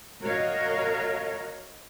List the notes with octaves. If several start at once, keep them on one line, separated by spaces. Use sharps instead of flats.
F#4 A#4 C#5 D#5 F5